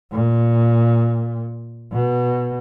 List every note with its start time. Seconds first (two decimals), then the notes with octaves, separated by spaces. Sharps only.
0.12 A#2
1.92 B2